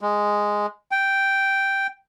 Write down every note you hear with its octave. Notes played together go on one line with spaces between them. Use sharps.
G#3
G5